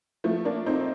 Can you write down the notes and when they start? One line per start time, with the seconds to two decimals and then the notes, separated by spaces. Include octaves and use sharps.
0.24 F3 A3
0.45 A#3 D4
0.66 C4 D#4